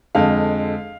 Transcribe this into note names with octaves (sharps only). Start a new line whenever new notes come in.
F2 D3 G#3 F5